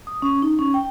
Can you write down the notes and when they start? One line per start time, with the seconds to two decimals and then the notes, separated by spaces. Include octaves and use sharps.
0.07 D#6
0.22 C#4
0.42 D#4
0.59 C#4
0.74 G5